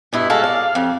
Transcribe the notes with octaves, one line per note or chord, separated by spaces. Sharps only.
G2 B2 E4
G#3 F#4 A4 F5
D5
F2